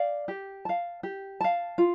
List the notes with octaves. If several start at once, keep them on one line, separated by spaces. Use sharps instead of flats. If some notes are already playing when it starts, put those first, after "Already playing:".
Already playing: D5 F5
G4
F5 A5
G4
F5 A5
F4